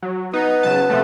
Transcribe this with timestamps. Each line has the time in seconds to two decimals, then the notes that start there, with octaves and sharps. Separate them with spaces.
0.03 F#3
0.33 B3 D#4 B4
0.63 C#3 F#3 A5
0.90 C3 F3 A3